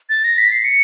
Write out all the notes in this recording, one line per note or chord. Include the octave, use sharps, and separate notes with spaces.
A6
A#6
B6
C7
C#7